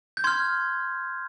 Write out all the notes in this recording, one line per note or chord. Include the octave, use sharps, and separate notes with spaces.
G6
C6 F6 G#6